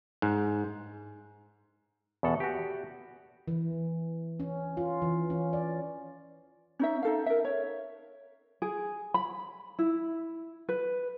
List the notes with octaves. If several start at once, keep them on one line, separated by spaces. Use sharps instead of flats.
G#2
E2 B2 A4 F#5
F#4 G4
E3
C#4
F4
E3
C#4
D5
C#4 D#4 E5
D#4 A4 F5
A#4 E5
C#5
G#4
B5
E4
B4